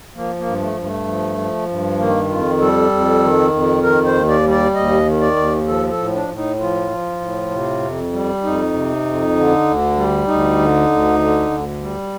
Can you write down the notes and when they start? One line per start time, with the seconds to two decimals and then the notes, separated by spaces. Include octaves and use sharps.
0.15 F3 A#3
0.38 A#3
0.46 G2
0.61 A3
0.77 G2
0.84 A3
1.07 F3
1.38 F3
1.69 G2
1.99 D#3 A#3
2.30 F2 F4
2.60 G3 A4
2.91 F2
3.22 D#3
3.53 F2
3.83 D#3 A#4
4.06 C5
4.14 D#2
4.29 D5
4.45 G3
4.52 D5
4.75 D#2 D#5
5.06 D#3
5.21 D5
5.36 D#2
5.67 F3 A4
5.90 A4
5.98 A2
6.14 D4
6.28 A2
6.36 D#4
6.60 F3 F4
6.90 F3
7.21 A2
7.51 C3
7.82 F2
8.13 G3
8.43 F2 D#4
8.74 C3
9.05 F2
9.35 D3
9.66 D2
9.97 G3
10.27 D2 D#4
10.59 D3
10.89 D2
11.20 D3
11.50 D2
11.81 G3